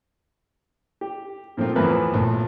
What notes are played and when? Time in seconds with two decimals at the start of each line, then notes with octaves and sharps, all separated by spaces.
1.01 G4
1.57 A#2 F3 A3 A#3 C4 F4
1.76 E2 A2 E3 F3 A#4 B4
2.14 A#1 A2